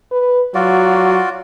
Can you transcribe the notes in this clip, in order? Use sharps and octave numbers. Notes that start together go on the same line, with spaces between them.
B4
F#3 F4 F#4 D5